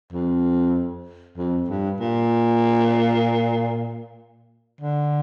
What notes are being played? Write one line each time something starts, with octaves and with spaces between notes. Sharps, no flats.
F2
F2
G2
A#2
D3